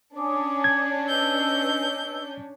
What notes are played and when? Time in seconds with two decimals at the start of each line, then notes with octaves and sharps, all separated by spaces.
0.17 C#4 D4 G#5 D6 D#6
0.64 G#6
1.07 B4 D#5 E6 G6